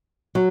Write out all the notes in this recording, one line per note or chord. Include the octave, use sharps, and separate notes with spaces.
F#3